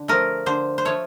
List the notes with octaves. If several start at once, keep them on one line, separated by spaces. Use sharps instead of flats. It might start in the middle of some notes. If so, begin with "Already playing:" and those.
Already playing: D3
F3 A3 A#4
D3 C5
C5
F3 A3 C#5